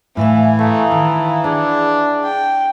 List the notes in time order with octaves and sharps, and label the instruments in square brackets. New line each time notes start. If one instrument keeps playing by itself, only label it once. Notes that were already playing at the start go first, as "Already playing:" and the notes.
[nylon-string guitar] A2 [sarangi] E3 [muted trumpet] E4 [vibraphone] E5 F5 G#5
[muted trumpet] A3 [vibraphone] F5 A#5 D#6
[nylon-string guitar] D#3 [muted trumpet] A5
[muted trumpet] D4 [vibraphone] G#4 [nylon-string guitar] F#5
[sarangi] G5